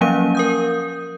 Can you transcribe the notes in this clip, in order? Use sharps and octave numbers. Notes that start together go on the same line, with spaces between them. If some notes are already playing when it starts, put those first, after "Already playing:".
F3 F#3 A#3 C#4 F5 D#7
A#4 D#6 G6